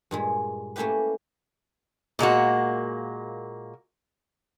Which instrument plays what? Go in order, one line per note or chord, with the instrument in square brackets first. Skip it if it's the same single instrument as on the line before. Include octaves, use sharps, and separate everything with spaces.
[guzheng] G2 A#2 G#3
A3 A#3 C#4 E4 G4 B4
[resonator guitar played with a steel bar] A#2 G#3 A#3 F#4